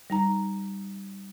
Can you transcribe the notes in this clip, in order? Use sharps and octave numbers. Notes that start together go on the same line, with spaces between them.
G3 D#4 A#5